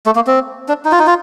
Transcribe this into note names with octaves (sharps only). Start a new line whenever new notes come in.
A3
A#3
C4
D4
D#4
F4
D#4
F4